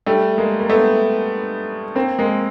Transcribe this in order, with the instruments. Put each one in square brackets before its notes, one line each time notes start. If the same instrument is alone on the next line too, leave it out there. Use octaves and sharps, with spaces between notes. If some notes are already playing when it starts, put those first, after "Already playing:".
[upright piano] G3 A3
G#3 A#3
A#3
A3 B3
A#3 C4
G#3 A#3